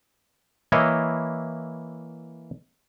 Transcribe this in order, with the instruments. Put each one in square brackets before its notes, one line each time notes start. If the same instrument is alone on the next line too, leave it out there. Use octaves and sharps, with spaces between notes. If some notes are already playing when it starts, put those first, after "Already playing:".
[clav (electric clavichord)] E3 A#3 E4 C#5 D#5